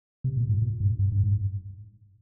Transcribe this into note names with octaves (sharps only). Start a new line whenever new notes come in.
C3
A#2
G#2
A#2
G2
G2
G2
G#2